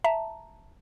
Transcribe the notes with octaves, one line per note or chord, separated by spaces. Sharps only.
E5 A5 A#5